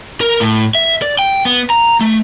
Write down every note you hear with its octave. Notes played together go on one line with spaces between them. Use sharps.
A#4
A2
E5
D5
G5
B3
A#5
A3